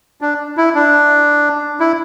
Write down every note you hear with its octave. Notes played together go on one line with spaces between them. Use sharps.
D4
E4
D4
E4